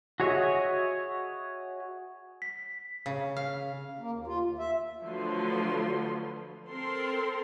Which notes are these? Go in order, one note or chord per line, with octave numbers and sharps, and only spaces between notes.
F#4 G#4 C#5 D#5 E5
B6
C#3
F5
A#3
D#2
F4
D#2
E5
D3 F3 F#3 A3 B4 C6
C4 A4 A#4 C6